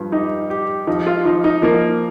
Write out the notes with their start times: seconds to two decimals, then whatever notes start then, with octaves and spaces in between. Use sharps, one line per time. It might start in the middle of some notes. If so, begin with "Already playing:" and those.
Already playing: G2 F3
0.12 D#4 G4
0.50 G4
0.87 F3 D#4
1.07 F4
1.25 F3 D#4
1.44 D#4
1.62 F3 A#3